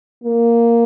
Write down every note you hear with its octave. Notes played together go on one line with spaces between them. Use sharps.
A#3